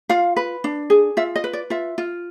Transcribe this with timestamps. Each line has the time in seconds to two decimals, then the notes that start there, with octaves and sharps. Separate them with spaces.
0.09 F4 F5
0.36 B4
0.64 D4
0.90 G#4
1.17 F4 E5
1.36 D#5
1.44 B4
1.53 D5
1.70 F4 E5
1.98 F4